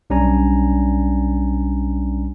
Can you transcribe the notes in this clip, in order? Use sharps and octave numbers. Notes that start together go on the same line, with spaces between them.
B1 G3 C#4 D4 G#5 A#5